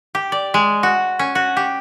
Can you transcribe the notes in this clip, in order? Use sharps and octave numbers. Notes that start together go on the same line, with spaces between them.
G4
D5
G#3
F#4
C#4
F#4
G4